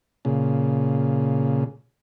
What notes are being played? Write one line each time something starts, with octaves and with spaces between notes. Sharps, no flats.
A#2 C#3